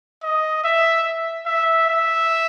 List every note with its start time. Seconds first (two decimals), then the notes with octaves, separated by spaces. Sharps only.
0.23 D#5
0.64 E5
1.46 E5
1.88 E5